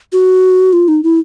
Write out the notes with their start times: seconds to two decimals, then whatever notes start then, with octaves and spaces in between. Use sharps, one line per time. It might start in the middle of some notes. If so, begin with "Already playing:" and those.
0.12 F#4
0.73 F4
0.88 D#4
1.03 E4